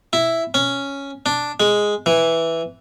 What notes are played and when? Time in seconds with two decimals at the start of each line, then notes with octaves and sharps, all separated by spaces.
0.13 E4
0.54 C#4
1.26 D4
1.60 G#3
2.06 E3